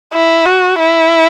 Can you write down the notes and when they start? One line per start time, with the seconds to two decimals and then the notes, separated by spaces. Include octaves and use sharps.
0.13 E4
0.46 F#4
0.79 E4